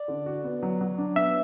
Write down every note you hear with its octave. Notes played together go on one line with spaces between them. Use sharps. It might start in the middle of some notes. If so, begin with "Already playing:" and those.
Already playing: D5
D3
F#4
B3
F#3
F#3
D4
B3 E5